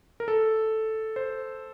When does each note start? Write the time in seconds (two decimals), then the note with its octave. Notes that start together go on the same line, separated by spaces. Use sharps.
0.20 A#4
0.28 A4
1.16 C5